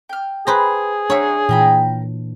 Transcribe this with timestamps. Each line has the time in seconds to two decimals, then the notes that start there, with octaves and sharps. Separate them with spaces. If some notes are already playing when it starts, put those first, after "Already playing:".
0.09 G5 F6
0.47 G#4 B4 C5 A#5
1.10 C4 D4 F#4 A#4 C#5 E5
1.49 A#2 E3 A#4 G5 B5